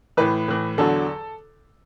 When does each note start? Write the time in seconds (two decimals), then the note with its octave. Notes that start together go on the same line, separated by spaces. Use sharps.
0.17 A2 E3 B4
0.48 A2 E3
0.78 E2 D3 F#3 A4